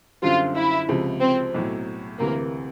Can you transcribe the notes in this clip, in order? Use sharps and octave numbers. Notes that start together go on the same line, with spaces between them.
F#2 D3 G3 C4 F4
E4
C#2 C3 F3 G#3
C4
B1 A2 F#3
D2 C3 E3 A#3